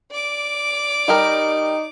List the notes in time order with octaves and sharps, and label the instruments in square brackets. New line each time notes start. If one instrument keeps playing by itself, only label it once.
[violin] D5 D6
[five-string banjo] G3 G4 A#4 [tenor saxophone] D#4